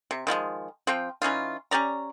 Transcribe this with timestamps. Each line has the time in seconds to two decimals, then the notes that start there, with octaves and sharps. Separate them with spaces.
0.11 C3
0.27 D#3 F3 G3 G#3
0.87 F3 C4 G5
1.22 E3 C#4 D#4 F4
1.71 C#4 G4 D5 A#5